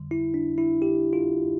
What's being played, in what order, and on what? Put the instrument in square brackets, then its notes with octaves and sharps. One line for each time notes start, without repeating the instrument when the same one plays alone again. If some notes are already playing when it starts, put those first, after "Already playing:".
Already playing: [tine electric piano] F2 D3 G3
E4
D4
E4
G4
F4